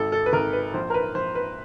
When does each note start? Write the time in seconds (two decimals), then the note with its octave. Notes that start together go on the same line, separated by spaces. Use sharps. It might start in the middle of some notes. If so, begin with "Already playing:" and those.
Already playing: G#1 A4
0.12 A4
0.26 B4
0.33 G#1 A#4
0.53 B4
0.74 A#1 C5
0.90 A#4
0.94 B4
1.15 A#1 C5
1.35 B4